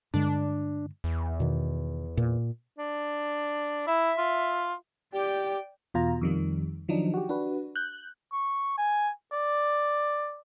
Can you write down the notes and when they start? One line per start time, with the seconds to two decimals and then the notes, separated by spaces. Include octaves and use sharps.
0.14 G2 D3 G#3 D4
1.04 E2
1.40 B2 D#3
2.17 A#2
2.79 D4
3.88 E4 E5
4.18 F4
5.13 G4 D5 G5
5.94 E2 B2 F4 A#5
6.21 F2 D#3 G3
6.88 D#3 F3 F#3 D4 D#4
7.14 F#4 G4
7.29 D4 F#4 B4
7.76 F#6 G6
8.32 C#6
8.77 G#5
9.32 D5